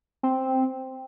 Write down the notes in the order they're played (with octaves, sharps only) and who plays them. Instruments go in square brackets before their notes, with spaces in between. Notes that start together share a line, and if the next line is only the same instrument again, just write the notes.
[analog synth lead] C4